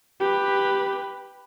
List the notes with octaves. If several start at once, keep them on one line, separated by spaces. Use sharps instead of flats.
G4 B4